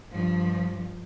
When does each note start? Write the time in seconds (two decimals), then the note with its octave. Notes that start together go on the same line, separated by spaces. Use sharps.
0.14 G2 F3